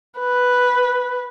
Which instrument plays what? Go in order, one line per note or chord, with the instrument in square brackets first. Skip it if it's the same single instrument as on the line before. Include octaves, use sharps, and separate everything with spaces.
[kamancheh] B4